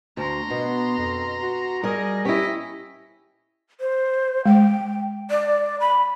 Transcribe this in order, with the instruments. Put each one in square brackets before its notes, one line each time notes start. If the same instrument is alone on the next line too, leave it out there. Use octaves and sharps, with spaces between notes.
[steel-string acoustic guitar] D2 [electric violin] A#5 C6
[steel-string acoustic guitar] B2 [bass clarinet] B3
[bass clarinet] F2
F#4
[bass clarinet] G3 [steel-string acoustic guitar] G#4 A#4 [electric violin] D#5
[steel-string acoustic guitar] C#4 E4 [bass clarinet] G4 [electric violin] D#5 B6
[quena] C5
[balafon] G#3 [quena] G5
[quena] D5
B5